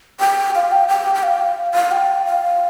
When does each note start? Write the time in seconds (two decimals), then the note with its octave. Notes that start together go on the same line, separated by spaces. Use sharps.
0.20 G5
0.55 F5
0.72 G5
0.88 G5
1.15 G5
1.23 F5
1.74 F5
1.92 G5
2.26 F5